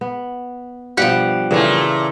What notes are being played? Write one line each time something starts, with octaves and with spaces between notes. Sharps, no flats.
B3
G2 B2 F3 G4 F#5
A#2 C#3 E3 A3